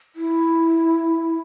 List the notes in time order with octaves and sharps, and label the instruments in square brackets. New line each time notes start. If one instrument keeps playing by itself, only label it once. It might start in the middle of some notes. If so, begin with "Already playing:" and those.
[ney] E4